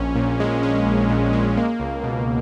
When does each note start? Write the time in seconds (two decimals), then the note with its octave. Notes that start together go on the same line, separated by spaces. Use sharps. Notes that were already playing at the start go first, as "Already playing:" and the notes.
Already playing: A#1 C#4
0.15 A#2
0.40 G#3
0.63 C#4
0.86 A#1
1.09 A#2
1.33 G#3
1.57 A#3
1.80 C#2
2.03 B2